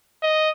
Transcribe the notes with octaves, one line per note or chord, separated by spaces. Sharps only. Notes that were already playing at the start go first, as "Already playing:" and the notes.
D#5